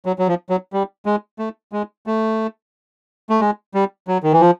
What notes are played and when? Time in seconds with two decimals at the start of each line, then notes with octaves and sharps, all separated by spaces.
0.06 F#3
0.19 F#3
0.28 F3
0.50 F#3
0.73 G3
1.06 G#3
1.39 A3
1.72 G#3
2.07 A3
3.30 A3
3.41 G#3
3.74 G3
4.08 F#3
4.23 D#3
4.32 E3
4.41 F3